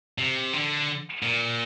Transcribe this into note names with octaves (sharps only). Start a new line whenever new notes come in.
C3
D3
A#2